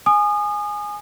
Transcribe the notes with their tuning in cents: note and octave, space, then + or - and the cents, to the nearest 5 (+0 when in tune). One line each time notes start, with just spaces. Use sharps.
G#5 +0 D#6 -30